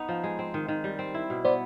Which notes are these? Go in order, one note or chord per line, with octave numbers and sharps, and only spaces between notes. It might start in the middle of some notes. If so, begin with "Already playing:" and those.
Already playing: B3 D#4
F3
G#3
C4
D#3
D#3
G3
C4
E4
B2
B3 C5 D5